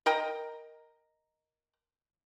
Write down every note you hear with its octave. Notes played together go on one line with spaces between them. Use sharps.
A#4 D#5 G5 A#5